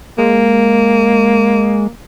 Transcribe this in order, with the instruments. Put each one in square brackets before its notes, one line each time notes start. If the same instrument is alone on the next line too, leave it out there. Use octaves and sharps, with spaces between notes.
[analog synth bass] G#3 [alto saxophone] A#3